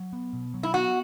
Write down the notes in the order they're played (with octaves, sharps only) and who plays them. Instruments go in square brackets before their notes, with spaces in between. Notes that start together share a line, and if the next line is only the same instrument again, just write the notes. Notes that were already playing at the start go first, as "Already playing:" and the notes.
Already playing: [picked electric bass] F#3
B3
B2
F#3
[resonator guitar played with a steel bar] E4
[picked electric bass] B3 [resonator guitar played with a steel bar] F#4